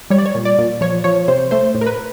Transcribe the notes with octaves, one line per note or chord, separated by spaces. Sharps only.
G3 C#5
D5
C#5
A#2
D5
A#2
F3 C#5
F3 C#5
C3 C5
A3 C5
A2
A#4
B4